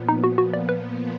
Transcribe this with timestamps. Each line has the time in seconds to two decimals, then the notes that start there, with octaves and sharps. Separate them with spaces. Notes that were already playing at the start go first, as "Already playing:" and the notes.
Already playing: A#2 F3 B3
0.09 D#4
0.24 F#4
0.38 F#4
0.53 D5
0.69 B4